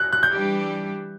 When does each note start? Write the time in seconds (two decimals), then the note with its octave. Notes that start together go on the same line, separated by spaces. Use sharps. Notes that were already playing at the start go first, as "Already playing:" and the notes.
Already playing: F#6
0.13 F#6
0.23 G6
0.33 E3 G3 D4 G4